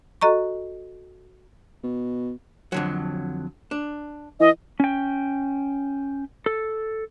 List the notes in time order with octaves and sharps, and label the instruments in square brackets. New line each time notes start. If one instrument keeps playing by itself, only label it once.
[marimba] F#4 A4 D#5 A#5 C#6
[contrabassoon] B2
[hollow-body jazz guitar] F2 D3 F#3
D4
[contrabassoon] E3 [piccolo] D#5
[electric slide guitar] C#4 G5
A4